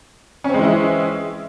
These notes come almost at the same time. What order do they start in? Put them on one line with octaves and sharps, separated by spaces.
C#4 C4 G#3 E3 E4